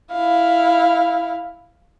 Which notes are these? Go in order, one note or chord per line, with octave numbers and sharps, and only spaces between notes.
E4 F5